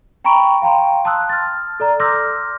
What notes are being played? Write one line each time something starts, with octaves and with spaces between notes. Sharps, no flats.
G5 A#5 B5 C#6 D7
F5 G5 A#5 C6
A5 C6 D#6 E6 F#6
F6 A6
A4 D5 A#5
C6 D6 E6 F6 G6 A#6